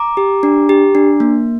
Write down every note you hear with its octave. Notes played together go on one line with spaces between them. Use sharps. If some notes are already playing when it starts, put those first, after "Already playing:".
Already playing: A#5 D6
G4
D4
G4
D4
A#3